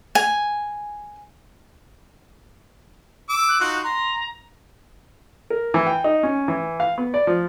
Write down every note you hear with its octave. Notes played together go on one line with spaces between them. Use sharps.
G#5
D6 E6
F#6
D#4 F4 F#4 F#6
A#5 C6
A#4
E3
G5
D#4
C#4
E3
F5
B3
D5
F3